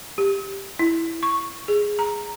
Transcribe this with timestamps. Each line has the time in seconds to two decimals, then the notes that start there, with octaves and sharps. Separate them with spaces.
0.18 G4
0.79 E4
1.23 C#6
1.68 G#4
1.99 A#5